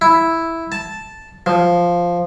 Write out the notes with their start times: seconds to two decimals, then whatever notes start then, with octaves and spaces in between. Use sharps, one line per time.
0.01 E4
0.72 A5
1.46 F3